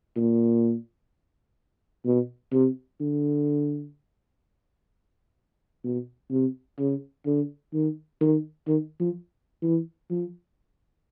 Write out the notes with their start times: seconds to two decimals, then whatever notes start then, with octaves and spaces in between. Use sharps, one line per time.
0.16 A#2
2.06 B2
2.53 C3
3.01 D3
5.84 B2
6.31 C3
6.79 C#3
7.26 D3
7.74 D#3
8.21 D#3
8.68 D#3
9.00 F3
9.63 E3
10.10 F3